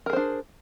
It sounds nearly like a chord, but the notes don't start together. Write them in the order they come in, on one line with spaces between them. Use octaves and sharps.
A#4 G#4 C5 D4